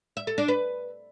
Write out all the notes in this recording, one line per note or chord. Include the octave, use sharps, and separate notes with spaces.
E5
A4
D4
B4